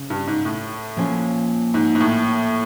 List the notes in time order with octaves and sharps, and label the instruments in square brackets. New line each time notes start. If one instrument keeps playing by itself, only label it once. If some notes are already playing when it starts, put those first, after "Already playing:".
Already playing: [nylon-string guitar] C#3
[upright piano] G2
G#2
A2
[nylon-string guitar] A#2 F3 A#3 C#4 F4
[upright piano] G#2
G#2
A2